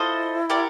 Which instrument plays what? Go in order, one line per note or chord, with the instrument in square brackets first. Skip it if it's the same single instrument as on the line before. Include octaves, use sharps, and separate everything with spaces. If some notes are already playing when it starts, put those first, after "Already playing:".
Already playing: [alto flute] E4 [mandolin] F4 A4 C5 D#5
[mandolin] G4 A#4 D5 F#5